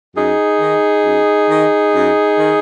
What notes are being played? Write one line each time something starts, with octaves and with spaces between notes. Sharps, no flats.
F#2 D#4 G#4
D#3
F#2
D#3
F#2
D#3